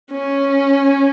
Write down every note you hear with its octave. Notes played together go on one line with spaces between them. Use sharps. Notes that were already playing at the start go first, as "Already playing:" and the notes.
C#4